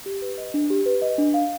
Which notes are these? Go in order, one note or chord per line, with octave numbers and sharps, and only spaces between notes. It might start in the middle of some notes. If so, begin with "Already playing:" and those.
G4
B4
D#5
D4
G4
B4
D#5
D4
F5